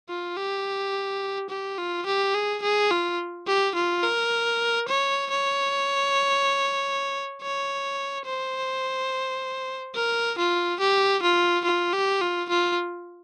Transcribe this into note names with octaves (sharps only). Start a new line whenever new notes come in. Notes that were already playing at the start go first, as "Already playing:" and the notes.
F4
G4
G4
F4
G4
G#4
G#4
F4
G4
F4
A#4
C#5
C#5
C#5
C5
A#4
F4
G4
F4
F4
G4
F4
F4